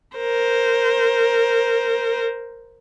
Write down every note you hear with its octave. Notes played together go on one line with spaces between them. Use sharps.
A#4 C5